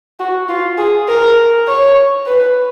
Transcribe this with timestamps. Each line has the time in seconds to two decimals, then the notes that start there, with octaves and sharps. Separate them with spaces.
0.19 F#4
0.49 F4
0.78 G#4
1.08 A#4
1.67 C#5
2.26 B4